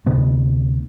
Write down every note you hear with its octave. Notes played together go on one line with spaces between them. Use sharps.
D2 C3 B3